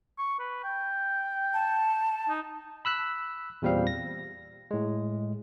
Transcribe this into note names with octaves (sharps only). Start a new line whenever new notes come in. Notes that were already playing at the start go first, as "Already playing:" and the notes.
C#6
B4
G5
A5
D#4
B5 E6 F#6 B6
E2 A#2 G3 C4 F5
A#6
A2 G#3